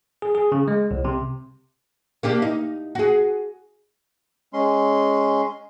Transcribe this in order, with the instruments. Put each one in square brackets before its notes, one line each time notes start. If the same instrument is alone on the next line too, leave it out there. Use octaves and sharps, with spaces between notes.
[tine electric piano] G#4
G#4
C#3
G#3
C2
C3
[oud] A#3 D4 G4
D#4
F#4 G#4
[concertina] G#3 C#4 C6